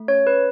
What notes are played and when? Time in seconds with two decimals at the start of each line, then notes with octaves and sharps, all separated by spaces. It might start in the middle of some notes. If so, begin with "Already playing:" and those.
Already playing: A3
0.08 C#4 C#5
0.27 C#4 B4